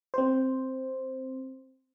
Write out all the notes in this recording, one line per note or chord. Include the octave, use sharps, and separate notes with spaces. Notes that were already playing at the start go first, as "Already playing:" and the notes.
C4 C5